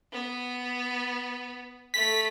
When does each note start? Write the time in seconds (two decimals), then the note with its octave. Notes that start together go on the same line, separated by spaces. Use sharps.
0.12 B3
1.94 A3 B6